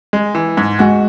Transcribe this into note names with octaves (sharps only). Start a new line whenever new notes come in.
G#3
E3
G#2
G#3 F#4